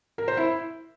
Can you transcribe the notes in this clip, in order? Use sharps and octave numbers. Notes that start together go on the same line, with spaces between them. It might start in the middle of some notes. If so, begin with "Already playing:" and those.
A#4
C5
E4